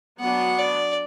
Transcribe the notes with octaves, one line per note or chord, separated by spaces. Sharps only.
F#3 B3 D4 F#5
D5